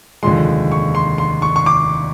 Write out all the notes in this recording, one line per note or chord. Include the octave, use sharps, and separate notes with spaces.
F1 D#2 D3 F3 G#3 C6
C#6
C6
C6
C#6
C#6
D6